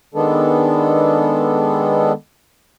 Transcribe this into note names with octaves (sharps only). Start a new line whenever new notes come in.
D#3 G#3 B3 D4 A4